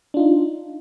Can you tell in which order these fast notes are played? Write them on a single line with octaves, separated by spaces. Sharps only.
D4 F4 D#4